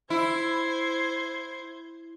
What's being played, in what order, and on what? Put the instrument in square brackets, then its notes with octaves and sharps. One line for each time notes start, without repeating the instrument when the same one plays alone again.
[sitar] E4 [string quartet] C5 G#6